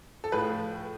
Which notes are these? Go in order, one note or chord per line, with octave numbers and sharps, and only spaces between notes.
A4
A2 F3 G#4 B4